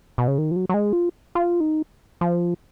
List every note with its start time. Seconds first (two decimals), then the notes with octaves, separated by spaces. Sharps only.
0.18 B2
0.28 C#3
0.38 D#3
0.51 F3
0.56 F#3
0.69 F#3
0.74 G#3
0.93 F4
1.35 F4
1.60 D#4
2.21 F3